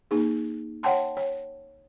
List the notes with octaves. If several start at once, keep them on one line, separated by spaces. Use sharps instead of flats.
A#3 D#4 G#4
C#5 F#5 G5 A5 C6
C#5